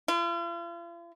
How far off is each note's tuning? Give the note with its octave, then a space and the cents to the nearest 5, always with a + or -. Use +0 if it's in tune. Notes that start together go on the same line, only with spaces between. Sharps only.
F4 -45